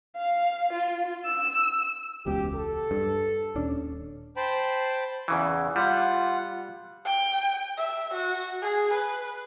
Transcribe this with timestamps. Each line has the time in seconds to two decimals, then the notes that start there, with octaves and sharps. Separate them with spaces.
0.16 F5
0.73 F4
1.25 E6
2.26 E1 C#2 B2 G4
2.55 A4
2.91 G2
3.55 D#1 C#4 D4
4.37 C5 G5 A5 B5
5.28 E2 C#3 E3
5.76 G3 F4 F#5
7.05 G5
7.78 E5
8.14 F#4
8.62 G#4
8.94 B4